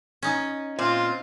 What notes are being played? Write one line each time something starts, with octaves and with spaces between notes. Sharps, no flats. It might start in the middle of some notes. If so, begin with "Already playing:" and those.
C#4 D#4
A#2 C4 F4